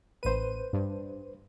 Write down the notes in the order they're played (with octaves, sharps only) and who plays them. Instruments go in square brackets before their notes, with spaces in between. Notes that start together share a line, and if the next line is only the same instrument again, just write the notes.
[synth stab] A1 D#7 [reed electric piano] B4 C5
[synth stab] G2